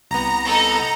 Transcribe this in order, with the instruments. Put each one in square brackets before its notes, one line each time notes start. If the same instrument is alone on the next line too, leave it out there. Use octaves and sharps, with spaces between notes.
[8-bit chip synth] C2 B3 [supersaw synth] A#5
[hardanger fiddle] D#4 A4